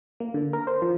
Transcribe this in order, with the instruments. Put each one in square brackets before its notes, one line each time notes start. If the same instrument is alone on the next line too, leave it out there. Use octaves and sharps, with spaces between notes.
[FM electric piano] A#3
D3
A#4
C5
F3